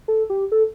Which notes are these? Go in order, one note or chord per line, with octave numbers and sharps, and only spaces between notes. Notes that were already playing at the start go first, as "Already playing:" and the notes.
A4
G4
A4